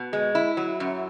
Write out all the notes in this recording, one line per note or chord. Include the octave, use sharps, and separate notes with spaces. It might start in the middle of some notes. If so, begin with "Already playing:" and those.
Already playing: B2
G#3
E4
F#3
F#2